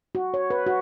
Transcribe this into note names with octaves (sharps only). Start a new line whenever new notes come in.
F#4
C#5
B4
F#4